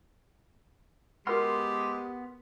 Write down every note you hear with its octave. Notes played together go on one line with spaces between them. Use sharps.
G#3 B3 F#4 G4 A#4 F#5 C6 F6